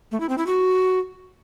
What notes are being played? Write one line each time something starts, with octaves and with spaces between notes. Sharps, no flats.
A3
E4
C4
E4
F#4